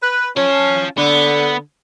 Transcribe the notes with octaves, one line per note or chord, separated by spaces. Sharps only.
B4
C#4 F4 A5
D3 B3